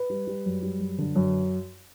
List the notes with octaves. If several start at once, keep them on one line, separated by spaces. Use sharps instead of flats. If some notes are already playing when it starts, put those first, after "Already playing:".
Already playing: B4
G3
G3
F#2
G3
F#2
D3
F#2